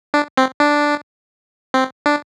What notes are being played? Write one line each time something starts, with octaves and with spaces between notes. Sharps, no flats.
D4
C4
D4
C4
D4